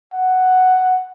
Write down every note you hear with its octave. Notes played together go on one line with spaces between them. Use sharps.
F#5